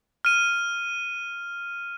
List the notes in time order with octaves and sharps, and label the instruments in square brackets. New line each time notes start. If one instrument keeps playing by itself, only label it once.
[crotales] F6 D#7